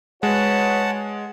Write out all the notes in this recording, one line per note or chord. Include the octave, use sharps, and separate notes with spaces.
G#3 F#4 B4 C#5 F#5 A5